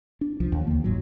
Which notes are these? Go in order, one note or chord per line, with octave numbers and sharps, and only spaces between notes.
D4
C2 F3
D#2
D#2 D3 A#3
F#1 G#2 F#3